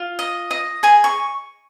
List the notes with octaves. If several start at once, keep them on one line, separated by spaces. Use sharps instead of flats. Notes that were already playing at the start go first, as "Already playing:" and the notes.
Already playing: F4
D#5
D#5
G#4 G#5
C#6